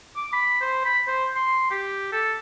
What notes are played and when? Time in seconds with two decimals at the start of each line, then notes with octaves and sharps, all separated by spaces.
0.16 D6
0.33 B5
0.61 C5
0.85 B5
1.07 C5
1.36 C6
1.71 G4
2.12 A4